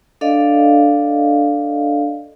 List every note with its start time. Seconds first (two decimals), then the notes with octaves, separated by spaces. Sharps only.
0.21 D4 A4 D5 D#5 F5